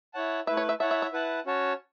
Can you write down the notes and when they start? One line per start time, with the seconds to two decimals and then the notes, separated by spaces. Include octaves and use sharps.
0.14 E4 C#5 F#5 A5
0.47 A3 E4 B4 E5
0.57 C#5
0.69 E5
0.79 E4 C#5 E5 F#5 A5
0.91 E5
1.02 E5
1.13 E4 B4 F#5 A5
1.46 C#4 F#4 C#5 A5